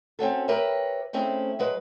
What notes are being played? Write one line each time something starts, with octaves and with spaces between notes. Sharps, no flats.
C4 C#4 F#4 A4
G4 A#4 B4 C#5 E5
G#3 A3 C4 C#4 E4
F#3 G#3 B4